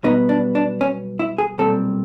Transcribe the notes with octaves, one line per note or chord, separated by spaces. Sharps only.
B1 B2 G3 B3 D#4
D4
D4
C#4
E4
G#4
B1 A#2 G3 C4 A4